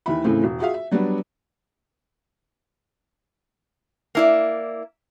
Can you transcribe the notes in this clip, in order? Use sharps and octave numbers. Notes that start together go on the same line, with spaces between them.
D#2 E3 E5 B5
A2 C#3 E3 A3 C4
E1
F4 F#4 G#4 E5 F5
E5
F#3 G3 B3 D4 F#4
A#3 E4 D5